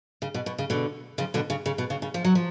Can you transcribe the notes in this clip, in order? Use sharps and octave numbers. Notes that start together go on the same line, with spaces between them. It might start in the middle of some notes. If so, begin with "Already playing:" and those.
C#3
B2
B2
C#3
B2 D3
C#3 F3
B2 D3
C#3
C#3
B2
C#3
C#3
F3
F#3
F3